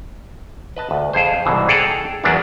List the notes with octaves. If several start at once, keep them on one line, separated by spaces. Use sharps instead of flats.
B4 D#5 A5
D2
F2 G#4 C5
C2 G#2 B2 E3
G#4 A4 F#5 G5 A5 A#5
E2 F#3 A#3 B3 D4